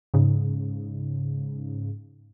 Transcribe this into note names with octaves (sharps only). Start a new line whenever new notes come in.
G#2 C#3